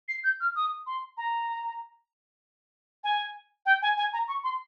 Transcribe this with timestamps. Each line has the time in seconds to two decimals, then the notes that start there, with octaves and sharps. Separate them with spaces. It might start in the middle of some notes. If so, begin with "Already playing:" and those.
0.08 C7
0.24 G6
0.40 F6
0.56 D#6
0.86 C6
1.17 A#5
3.04 G#5
3.66 G5
3.82 G#5
3.97 G#5
4.13 A#5
4.28 C#6
4.44 C6